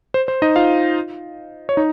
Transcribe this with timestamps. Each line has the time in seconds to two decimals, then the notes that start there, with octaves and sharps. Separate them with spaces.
0.14 C5
0.28 C5
0.42 D#4 D#5
0.56 F4 F5
1.69 C#5
1.77 D#4